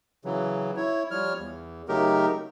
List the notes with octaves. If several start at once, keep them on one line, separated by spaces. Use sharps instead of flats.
C#3 E3 F#3
E4 C#5
F3 G3 C#5 F6
E2
C#3 F#3 A3 D#4 G4 A#4